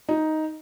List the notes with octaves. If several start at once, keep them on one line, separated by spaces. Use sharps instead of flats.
D#4